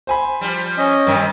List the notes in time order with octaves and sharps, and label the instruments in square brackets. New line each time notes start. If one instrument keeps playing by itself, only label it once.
[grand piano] C5 G#5 B5
[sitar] F3 G3
[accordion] C#4 D#5
[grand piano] G2 [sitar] C3 D#3 A#3